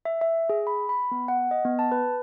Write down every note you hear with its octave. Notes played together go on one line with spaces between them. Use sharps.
E5
E5
G#4
B5
B5
B3
F#5
D#5
B3
A5
B4